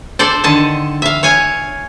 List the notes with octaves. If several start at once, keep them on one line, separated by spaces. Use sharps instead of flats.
A4 C5 D5
D3 D#3 A5
E5 F5
C#5 F5 G#5